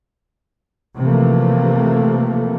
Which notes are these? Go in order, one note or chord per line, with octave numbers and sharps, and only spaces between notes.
C3 E3 F3 A3 A#3